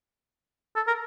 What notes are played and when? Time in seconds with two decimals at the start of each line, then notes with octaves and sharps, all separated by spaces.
0.76 A4
0.87 A#4